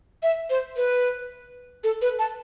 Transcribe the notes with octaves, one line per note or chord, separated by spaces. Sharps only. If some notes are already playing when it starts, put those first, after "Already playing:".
E5
C5
B4
A4
B4
A5